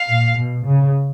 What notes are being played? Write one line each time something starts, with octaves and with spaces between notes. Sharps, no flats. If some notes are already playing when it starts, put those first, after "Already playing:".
Already playing: F5
A#2
B2
C#3